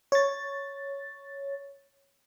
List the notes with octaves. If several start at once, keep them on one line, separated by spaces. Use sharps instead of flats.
C#5 A6